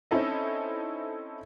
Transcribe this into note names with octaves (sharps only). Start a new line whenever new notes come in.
C4 C#4 D#4 E4 A4 D#5